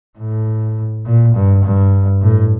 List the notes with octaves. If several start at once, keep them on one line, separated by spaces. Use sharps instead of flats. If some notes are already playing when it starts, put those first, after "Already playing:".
A2
A#2
G2
G2
A2